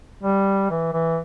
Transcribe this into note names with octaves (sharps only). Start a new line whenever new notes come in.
G3
E3
E3